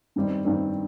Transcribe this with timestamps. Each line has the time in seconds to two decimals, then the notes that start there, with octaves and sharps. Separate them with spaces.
0.16 G2 D#3 G3 C4
0.45 G2 D#3 G3 C4